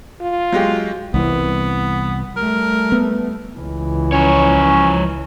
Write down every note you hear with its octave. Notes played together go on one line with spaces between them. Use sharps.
F4
F#3 G#3 G4
C2 E3 B3
G3 A3 A#4
B3
C#2 E3
F3 C#4 C#5